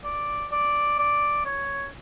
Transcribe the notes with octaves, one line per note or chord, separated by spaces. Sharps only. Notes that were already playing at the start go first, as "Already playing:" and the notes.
D5
D5
D5
C#5